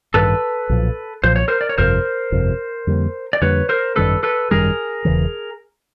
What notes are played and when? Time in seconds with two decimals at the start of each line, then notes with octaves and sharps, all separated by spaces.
0.14 A1 G2 D#3 A4 B4
0.69 B1 A#2 F3
1.24 B1 A#2 F3 C5
1.36 C#5
1.48 A#4 C5
1.61 D5
1.69 C#5
1.78 G1 F2 C3 A#4 C5
2.32 G1 F2 C3
2.87 F2 D3 G3 A#3
3.33 D5
3.41 F2 D3 G3 A#3 B4 C#5
3.69 A#4 C5
3.96 G#1 F#2 D#3 G3 A4 B4
4.23 A4 B4
4.51 G#1 F#2 D#3 G3 G#4 A#4
5.05 E1 E2 C#3 E3